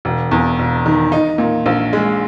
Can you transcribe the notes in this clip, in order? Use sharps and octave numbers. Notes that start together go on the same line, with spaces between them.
E1
E2
E1
D#3
D#4
A#2
A#1
G#3